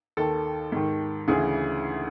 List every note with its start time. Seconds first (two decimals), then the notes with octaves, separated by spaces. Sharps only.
0.17 D#2 D#3 A4
0.72 G#2 D#3
1.28 D2 C#3 E3 G#4